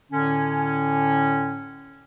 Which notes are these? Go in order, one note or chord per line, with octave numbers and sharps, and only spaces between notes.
A2 D3 C#4